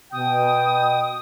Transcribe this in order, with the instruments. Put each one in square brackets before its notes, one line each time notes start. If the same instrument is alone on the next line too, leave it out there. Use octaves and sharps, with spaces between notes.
[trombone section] B2 [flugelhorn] G5 [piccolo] D#6